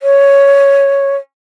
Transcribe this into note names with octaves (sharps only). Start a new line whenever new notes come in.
C#5